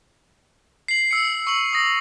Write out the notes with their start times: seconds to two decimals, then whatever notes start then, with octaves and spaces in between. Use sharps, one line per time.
0.88 C7 F#7
1.11 E6 C#7
1.47 C#6 F#7
1.73 D#6 A#6